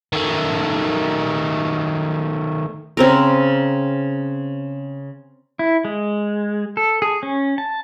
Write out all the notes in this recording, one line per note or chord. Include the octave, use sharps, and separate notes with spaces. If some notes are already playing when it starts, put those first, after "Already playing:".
D#3 A3
C#3 C4 A#4
E4
G#3
A4
G#4
C#4
A5